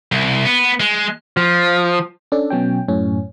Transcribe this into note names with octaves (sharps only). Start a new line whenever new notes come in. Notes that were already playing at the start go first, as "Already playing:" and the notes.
C2
B3
G#3
F3
C#4 D4 A4
B2 F#3 C#4 G5
F#2 A2 C#4